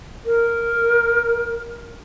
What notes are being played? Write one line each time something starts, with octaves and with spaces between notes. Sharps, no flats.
A#4